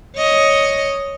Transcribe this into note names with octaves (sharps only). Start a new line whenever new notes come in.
C#5 D#5